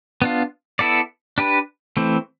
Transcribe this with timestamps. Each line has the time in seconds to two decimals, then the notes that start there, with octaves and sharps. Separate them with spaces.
0.22 B3 D4 F4
0.79 B3 E4 A4 D5
1.38 D4 G4 B4
1.97 E3 A3 C4